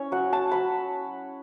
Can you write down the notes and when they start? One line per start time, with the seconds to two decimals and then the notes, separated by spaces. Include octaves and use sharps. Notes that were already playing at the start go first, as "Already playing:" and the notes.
Already playing: C#4 E4 C#5
0.12 F#3 F#5
0.33 A5
0.51 F#3 B5